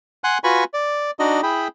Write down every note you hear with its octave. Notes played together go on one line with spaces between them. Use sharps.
F#5 G#5 C6 F#6
F4 F#4 B4 G#5 B5 C#6
D5
D4 D#4 F#4 D#5
E4 G#4 G5 B5